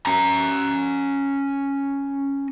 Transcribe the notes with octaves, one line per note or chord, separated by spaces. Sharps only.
C#4 A#5